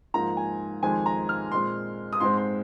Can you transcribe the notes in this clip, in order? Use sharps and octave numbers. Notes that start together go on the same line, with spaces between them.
G#2 F3 A#3 A#5
G#5
F2 D#3 G#3 C4 G#5
A#5
F6
A#2 G#3 C4 C6
D#6
G#2 G#3 C4 C6
C6